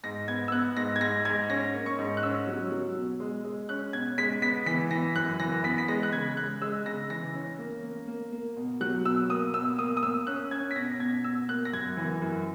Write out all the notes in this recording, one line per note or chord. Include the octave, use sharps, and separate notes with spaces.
G#2 A#6
B3 G#6
E6
B3 F#6
G#2 A#6
G#6
G#2 A#6
G#2 G#6
C#4 A#6
A#3
C#6
G#2
F#6
C#4 E6
F#3
F#3
B2
G#3
G#3
C#4 F#6
B2 G#6
G#3 B6
B3 B6
E3 B6
E3 A#6
F#2 F#6
E3 A#6
B3 B6
B6
G#3 A#6
F#6
C#3 G#6
G#3 F#6
G#3 E6
C#3 A#6
E3 A#6
C#4
A#3
A#3
A#3
A#3
B2
F#3 F#6
B2 E6
A#3 D#6
B2 E6
A#3 D#6
D#6
A#3 E6
C#4 F#6
C#4 G#6
B6
B2 A#6
A#6
B2 G#6
B2 E6
A#3 F#6
A#6
F#2 G#6
E3
F#2